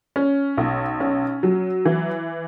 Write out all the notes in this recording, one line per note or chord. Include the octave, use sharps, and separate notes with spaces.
C#4
B1
C#4
F#3
E3